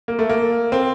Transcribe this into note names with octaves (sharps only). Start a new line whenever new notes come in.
A#3
A3
A#3
C4